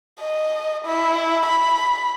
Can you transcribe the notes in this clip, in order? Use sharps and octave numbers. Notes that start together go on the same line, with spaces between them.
D#5
E4
B5